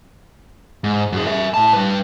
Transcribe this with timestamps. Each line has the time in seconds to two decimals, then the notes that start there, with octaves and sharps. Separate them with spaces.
0.84 G#2
1.12 F#2 G#4
1.26 A#4 E5
1.54 A2 A5
1.73 G3 B4